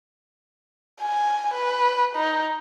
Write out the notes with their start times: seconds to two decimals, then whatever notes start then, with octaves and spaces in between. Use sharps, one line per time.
1.01 G#5
1.54 B4
2.16 D#4